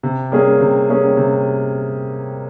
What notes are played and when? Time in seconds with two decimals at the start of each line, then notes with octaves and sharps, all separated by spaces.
0.03 C3
0.32 G3 A#3 C#4 G#4
0.60 C3
0.89 G3 A#3 C#4 G#4
1.17 C3